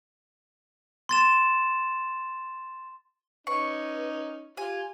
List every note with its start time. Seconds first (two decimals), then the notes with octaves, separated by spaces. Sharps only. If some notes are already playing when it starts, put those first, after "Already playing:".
1.09 C6 A6 E7
3.47 C#4 D#4 B4 C#6
4.57 F4 G4 G#5